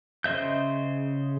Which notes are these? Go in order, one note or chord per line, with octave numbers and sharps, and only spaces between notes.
C#3 C5 D#5 E5 G6